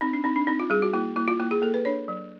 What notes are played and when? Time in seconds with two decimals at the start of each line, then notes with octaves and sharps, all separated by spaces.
0.01 C4 D#4
0.13 D4
0.24 C4 D#4
0.36 D4
0.47 C4 D#4
0.60 F4
0.70 G3 G#4
0.82 F#4
0.93 A#3 E4
1.16 A#3 E4
1.28 F4
1.40 A#3 E4
1.51 G#4
1.62 A#3 A4
1.74 B4
1.85 D4 C#5
2.08 F#3